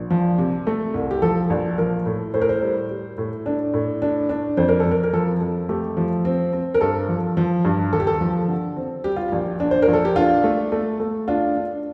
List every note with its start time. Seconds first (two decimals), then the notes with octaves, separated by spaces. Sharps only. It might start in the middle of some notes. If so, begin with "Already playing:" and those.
Already playing: A#1
0.10 F3
0.38 C3
0.67 A3
0.94 C2
1.11 G4
1.22 F3 A4
1.50 A#1
1.78 F3 A#4
2.06 A2
2.34 A2 C5
2.41 A#4
2.49 C5
2.62 G3
2.90 G3
3.18 A2
3.46 D4
3.74 A2
4.02 D4
4.29 D4
4.57 F2 C5
4.69 A#4
4.80 A4
4.86 F2
4.91 A#4
5.04 A#4
5.13 F3 A4
5.41 F2
5.69 A3 G4
5.97 F3
6.25 C4
6.53 C4
6.74 A#4
6.81 G2 A4
7.09 F3
7.37 F3
7.65 G2
7.92 D#2 A4
8.00 G4
8.07 A4
8.21 F3
8.48 D3
8.76 C4
9.04 G3 G4
9.16 F4
9.28 A#1 G4
9.60 D4
9.71 C5
9.82 A#4
9.88 A#1
9.93 A4
10.05 G4
10.16 D4 F4
10.44 A3
10.72 A3
11.00 A3
11.28 D4 F4
11.56 D4